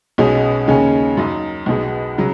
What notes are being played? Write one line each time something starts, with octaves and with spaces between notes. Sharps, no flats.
B1 B2 G#3 C#4
D#2 C#3 G#3 C#4
F#2 F#3 D#4
B1 B2 G#3
C#3 F#3